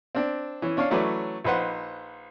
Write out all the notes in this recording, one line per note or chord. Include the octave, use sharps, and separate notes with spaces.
C4 D4
E3 C#4
C#4 D4 C#5 F5
E3 F#3 A3 C#4 B4 D5
A#1 D#4 B4 C5 F#5